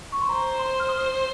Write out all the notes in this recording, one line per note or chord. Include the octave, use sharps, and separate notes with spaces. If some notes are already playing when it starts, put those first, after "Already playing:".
C#6
C6
C5 A#5
C6
F6
D#6